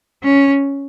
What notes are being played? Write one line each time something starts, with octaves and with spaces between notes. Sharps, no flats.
C#4